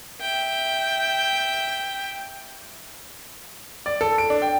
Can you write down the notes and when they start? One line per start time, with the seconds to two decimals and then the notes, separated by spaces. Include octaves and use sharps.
0.21 E5 G5
3.86 D5
4.01 A4
4.18 D7
4.30 D4
4.42 G5